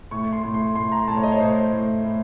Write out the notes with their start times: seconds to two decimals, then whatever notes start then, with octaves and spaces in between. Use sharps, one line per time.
0.11 A2 C#6
0.33 C6
0.43 A2
0.54 C6
0.75 A2 C6
0.92 A#5
1.08 A2 A5
1.17 C#5
1.23 D#5
1.32 C#5
1.39 A2 C5
1.72 A2
2.04 A2